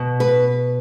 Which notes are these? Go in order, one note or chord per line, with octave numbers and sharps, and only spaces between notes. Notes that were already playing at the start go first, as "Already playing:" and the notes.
Already playing: B2
B4